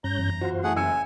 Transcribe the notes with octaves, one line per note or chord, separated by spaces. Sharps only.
G2 C#4 A#5 G6
F#2 E3 B3
F4 F#4 C5
A2 A3 G#4 F#5
F#1 E5 G#5 E6 C#7